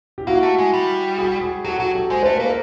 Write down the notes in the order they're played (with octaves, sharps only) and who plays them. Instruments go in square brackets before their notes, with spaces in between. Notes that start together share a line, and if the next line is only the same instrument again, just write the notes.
[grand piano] G4
[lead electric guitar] A#3 [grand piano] E4 F#4
[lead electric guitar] A3
G#3
G3
[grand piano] F#4 G#4
F#4 G#4
[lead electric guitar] F#3 [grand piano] G4 A4
[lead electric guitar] F#3 [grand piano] F#4 G#4
[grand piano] G4 A4
[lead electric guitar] G#3 [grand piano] C5
[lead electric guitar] A3 [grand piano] B4
[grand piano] A#4
[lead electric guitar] A#3
[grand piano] A4 B4